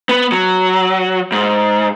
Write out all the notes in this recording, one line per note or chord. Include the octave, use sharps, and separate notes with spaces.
B3
F#3
G#2